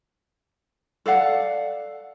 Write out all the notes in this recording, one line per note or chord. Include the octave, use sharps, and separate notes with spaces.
A4 D5 F5 F#5